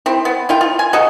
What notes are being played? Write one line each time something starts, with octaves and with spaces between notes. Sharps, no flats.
C4 E4
B3
E4 F4 G5
F4
G#5
F#4 A4 D#5